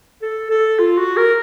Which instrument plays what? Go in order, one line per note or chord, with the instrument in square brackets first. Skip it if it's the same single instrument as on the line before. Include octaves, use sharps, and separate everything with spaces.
[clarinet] A4
A4
F4
F#4
A#4